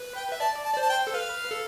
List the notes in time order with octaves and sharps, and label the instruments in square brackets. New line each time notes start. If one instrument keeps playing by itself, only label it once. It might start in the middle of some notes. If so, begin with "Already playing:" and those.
Already playing: [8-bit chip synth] B4
[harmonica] G5
[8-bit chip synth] E5
[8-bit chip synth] D5 [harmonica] A5
[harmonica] A5
[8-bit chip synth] D5
C5
[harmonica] A5
G5
[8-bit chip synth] A4
[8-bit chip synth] B4 [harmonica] F5
[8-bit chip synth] A4